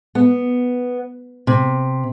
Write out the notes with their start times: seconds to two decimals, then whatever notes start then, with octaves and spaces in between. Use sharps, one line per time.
0.15 B3
1.47 C3